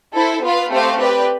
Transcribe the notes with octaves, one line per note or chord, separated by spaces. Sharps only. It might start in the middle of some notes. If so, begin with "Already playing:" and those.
E4 A4 C5
B3 F4 B4 F5
A3 C4 G4 C5 F5
C4 G4 B4 D5